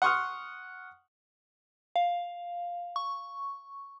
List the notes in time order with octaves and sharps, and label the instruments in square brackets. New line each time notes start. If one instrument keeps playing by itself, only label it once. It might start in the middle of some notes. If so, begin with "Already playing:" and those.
[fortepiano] F#5 C6 C#6 D#6 F6
[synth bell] F5
C#6